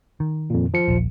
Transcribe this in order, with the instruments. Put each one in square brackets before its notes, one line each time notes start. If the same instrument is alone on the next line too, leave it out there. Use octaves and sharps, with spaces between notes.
[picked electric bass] D#3
[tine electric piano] F2 A#2
F3 C#7
[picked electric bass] D#1 A#1